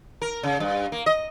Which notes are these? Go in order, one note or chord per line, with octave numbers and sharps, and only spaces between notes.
A#4
C#3
G2
A#3
D#5